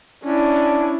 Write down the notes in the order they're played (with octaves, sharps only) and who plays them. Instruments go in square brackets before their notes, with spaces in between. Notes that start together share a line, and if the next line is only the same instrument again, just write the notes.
[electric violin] C#4 E4 [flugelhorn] D4